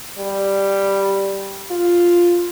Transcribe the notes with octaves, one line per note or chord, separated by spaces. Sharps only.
G3
F4